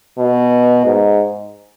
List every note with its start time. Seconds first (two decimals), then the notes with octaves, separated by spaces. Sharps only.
0.18 B2
0.85 G#2